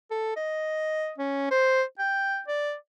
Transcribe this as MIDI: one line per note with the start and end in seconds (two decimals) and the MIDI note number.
0.11 0.35 69
0.36 1.12 75
1.18 1.46 61
1.51 1.82 72
1.99 2.41 79
2.48 2.75 74